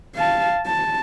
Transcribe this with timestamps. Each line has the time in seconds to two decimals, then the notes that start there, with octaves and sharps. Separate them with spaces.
0.16 F5 A5
0.67 A5